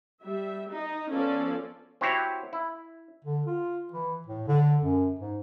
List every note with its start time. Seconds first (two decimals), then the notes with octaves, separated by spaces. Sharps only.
0.21 G3 E5
0.69 D#4 D#5
1.11 F3 B3 C#4 F4 A4 D5
2.01 C4 E4 F#4 G4 C5 C#5
2.53 E4
3.25 D3
3.46 F4
3.92 E3
4.26 A2
4.48 D3
4.81 F#2
5.19 G#2